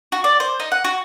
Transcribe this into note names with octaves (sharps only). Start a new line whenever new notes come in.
F#4
D5
C5
D#4
F#5
F#4